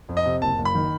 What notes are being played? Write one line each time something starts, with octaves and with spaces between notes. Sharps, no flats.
F2
D#5
C3
F#1 A5
F#1
B5
D#3